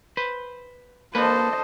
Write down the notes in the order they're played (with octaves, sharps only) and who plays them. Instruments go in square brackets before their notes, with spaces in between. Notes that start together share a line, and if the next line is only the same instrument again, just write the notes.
[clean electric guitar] B4 C5
[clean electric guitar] A#3 B4 [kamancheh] D4 A4 [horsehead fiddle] C5 D#5